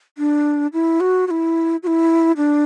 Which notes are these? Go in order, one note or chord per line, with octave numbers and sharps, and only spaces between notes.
D4
E4
F#4
F#4
E4
F#4
E4
D4